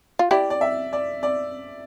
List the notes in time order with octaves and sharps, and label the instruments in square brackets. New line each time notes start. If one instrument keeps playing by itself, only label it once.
[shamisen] F4
[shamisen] E4 G4 [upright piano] D5
[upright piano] D5
E5
D5
D5